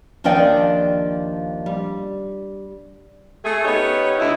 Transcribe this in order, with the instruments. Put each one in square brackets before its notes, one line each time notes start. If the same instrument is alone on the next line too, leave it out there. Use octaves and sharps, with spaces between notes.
[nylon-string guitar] D#2 F3 D4 D5 D#5 G5
G3
[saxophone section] A3 G#4
B3 C#4 D#4 G4 C#5
D2 D#4 E4